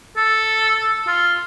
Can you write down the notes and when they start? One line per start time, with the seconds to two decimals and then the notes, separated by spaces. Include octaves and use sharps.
0.17 A4
1.07 F4